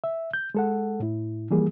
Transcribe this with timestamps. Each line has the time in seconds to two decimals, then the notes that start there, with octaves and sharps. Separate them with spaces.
0.04 E5
0.34 G6
0.55 G#3 A4 F#5
1.00 A2 E4
1.51 E3 F3 G3 A#3 G#4